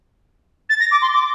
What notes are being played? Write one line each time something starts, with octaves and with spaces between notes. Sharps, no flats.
A6
A#6
D6
C6
D6